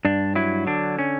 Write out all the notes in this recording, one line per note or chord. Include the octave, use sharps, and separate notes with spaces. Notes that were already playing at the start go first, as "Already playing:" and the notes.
G2 D4
F#3 E4
D3 D4
C#4